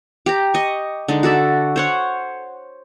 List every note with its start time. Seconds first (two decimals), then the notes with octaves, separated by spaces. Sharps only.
0.26 G4 A#5
0.54 D#5 C#6
1.08 D3 G#3 D#4
1.23 F#4 A4 D5 E5
1.76 C5 C#5 F#5